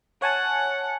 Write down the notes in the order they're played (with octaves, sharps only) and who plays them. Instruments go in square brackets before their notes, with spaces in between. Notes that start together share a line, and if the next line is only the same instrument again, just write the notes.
[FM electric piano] C#5 G#5 A5 [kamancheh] F#5